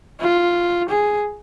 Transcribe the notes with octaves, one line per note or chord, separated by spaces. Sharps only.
F4
G#4